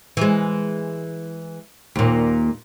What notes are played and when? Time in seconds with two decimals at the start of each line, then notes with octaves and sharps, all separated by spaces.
0.17 E3 G#3
1.96 D#2 A#2